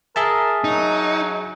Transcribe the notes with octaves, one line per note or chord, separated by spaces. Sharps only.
G#4 A#4 E5 A5
F#3 D#4